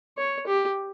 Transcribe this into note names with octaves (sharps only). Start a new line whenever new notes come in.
C#5
G4